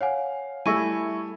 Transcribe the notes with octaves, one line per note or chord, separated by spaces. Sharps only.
C#5 F5 F#5 G#5
G3 A3 E4 G#5 C#6 E6 A#6 D#7